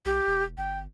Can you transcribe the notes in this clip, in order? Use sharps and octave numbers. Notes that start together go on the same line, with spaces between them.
B1 G4
E1
G1 G5